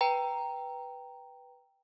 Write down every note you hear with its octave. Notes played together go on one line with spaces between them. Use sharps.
B4 G5 A#5